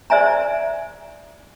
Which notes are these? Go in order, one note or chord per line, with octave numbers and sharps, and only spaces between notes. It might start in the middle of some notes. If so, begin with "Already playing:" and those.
C5 D5 E5 G#5 A#5